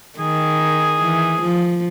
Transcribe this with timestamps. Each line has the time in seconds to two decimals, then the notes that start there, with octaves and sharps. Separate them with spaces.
0.19 D#3 G#4
1.01 E3
1.42 F3